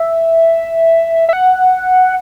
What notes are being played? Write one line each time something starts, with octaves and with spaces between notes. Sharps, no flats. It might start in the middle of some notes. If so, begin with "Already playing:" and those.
Already playing: E5
E5
F#5